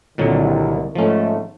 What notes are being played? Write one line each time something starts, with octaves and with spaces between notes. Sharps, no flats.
C2 A#2 D3 D#3 F#3
G#2 F3 A3 C#4